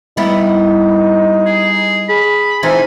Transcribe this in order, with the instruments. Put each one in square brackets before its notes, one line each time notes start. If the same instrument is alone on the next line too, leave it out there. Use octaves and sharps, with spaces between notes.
[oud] G3 B3 E4 [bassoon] D#4
[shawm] G#4
[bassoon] G#4 [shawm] B5
[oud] E3 D#4 F4 [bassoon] C4 [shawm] G#5